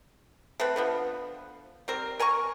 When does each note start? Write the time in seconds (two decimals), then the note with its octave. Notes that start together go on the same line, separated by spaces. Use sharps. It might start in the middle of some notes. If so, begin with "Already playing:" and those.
0.60 A3 C4 B4
0.76 D3 F3 B3
1.88 G3 C4 A#4
2.19 A#4 G#5 A#5 C#6